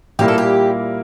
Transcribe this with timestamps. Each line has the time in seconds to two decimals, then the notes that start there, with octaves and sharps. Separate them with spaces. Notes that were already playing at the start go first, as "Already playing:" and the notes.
0.19 A#2 G3 A#3 E4 G4 A#4
0.28 A4
0.38 G4